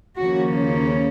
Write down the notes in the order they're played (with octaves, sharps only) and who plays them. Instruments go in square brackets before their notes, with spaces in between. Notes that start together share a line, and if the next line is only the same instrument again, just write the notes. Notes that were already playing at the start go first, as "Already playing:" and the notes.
[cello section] D#2 C#3 F3 A#3 C#4 F#4